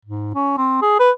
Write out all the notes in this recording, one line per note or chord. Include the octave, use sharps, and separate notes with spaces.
G#2
C#4
C4
G#4
B4